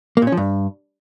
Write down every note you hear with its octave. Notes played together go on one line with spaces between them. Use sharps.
A#3
A#2
C#4
F3
G2